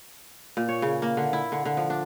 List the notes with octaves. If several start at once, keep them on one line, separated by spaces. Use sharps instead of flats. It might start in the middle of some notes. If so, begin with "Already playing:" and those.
A#2
C#5
C#3
A#3
D3
E4
D3
D3
F3
D4